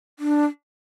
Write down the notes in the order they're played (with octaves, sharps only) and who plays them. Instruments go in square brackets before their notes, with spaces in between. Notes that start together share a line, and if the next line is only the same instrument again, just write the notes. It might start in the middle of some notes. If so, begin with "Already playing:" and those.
[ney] D4